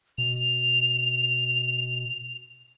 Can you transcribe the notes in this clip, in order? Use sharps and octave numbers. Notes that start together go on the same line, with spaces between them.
B2 F7